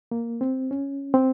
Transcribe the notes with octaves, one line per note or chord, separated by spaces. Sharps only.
A#3
C4
C#4
C4